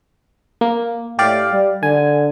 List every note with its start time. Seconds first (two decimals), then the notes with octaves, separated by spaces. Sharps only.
0.61 A#3
1.19 A2 G4 D5 F5
1.53 G3
1.83 D3 G#5